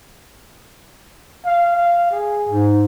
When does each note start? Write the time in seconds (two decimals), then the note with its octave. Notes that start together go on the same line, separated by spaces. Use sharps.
1.45 F5
1.76 F5
2.11 G#4
2.49 G#2